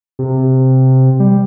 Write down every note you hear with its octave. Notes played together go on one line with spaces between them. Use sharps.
C3
G3